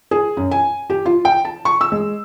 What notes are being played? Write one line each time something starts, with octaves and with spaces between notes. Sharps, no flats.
G#4
F#2
G#5
G4
F4
G5
A5
C#6
E6
G#3